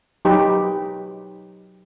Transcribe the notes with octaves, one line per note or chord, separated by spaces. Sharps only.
F#3 D#4 G4 B4